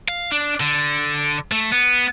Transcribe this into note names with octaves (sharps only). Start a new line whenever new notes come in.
F5
D4
D3
A3
B3